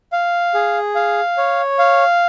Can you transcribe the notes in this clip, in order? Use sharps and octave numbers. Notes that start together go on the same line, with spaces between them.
F5
G#4
F5
C#5
F5